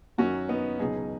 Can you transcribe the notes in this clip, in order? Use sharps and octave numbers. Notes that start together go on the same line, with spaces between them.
F#2 D#3 F#3 C#4 F#4
B3 D#4
C#2 B2 F#3 D#4 G#4